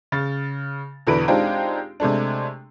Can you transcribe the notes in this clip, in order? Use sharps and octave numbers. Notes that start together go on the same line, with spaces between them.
C#3 A6
E2 B2 D3 E3 B4 D7
G#3 C4 D4 D#4 F4 G4
C3 G#3 A3 D4